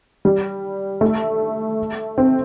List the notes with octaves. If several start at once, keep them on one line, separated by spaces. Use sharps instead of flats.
G3
A3
C4